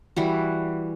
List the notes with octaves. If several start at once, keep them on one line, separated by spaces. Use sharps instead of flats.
E3 G3 F#4